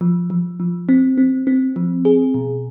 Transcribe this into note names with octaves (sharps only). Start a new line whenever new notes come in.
F3
F3
F3
C4
C4
C4
F3
G#4
B2